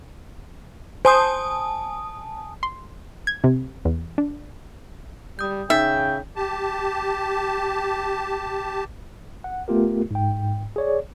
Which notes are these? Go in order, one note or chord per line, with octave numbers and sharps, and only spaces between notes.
C5 G#5 A5 D#6
C6
G#6
C3
E2
D4
G3 D#6 G6
C#3 D#4 E5 G5
G4 A5
F#5
A3 B3 F4 G4 A#4
G#2 G5
G#4 C#5 D5